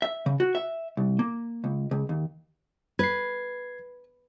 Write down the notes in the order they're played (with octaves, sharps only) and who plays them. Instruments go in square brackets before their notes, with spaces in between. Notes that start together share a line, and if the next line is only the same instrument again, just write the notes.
[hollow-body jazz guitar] E5
C#3
F#4
E5
C2
A#3
C#2
C#2
D#2
[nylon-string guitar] B4 [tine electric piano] G#6 C7